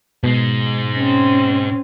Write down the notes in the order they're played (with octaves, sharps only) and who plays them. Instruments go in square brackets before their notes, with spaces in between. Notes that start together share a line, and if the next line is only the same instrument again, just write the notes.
[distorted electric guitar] G#2 G#3 [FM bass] B2
[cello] C4 C#4